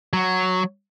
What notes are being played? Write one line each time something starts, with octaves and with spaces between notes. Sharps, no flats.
F#3